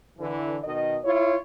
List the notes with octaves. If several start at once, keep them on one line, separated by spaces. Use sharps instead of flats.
D3 E3
B2 D#3 D#5
E4 F4 C#5